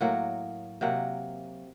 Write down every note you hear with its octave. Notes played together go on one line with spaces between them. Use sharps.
A2 F#3 A#3 F#5
C3 F#3 A#3 F#5